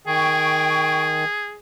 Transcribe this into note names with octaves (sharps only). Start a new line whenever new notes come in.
D#3 G#4 G5 C#6